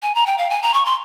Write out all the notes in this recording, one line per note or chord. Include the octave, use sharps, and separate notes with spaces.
G#5
A#5
G5
F5
G#5
A#5
C#6
C6